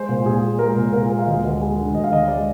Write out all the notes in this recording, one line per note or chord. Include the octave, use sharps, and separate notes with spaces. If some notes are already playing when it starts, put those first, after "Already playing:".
Already playing: G#3 C5
A#2
A#2 G#4
G#3
G#3 A#4
A#2
A#2 A#4
G#3
F5
D2 D#5
D2
G#3
D3
D2 D#5
F5
D2 D#5
G#3 D5